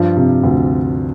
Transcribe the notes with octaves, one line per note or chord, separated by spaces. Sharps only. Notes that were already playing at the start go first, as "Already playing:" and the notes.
Already playing: G2 F3
C3
D2